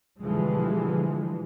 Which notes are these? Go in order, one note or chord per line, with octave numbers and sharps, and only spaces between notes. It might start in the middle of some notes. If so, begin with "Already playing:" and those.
B2 D3 E3 F3 G3 G#3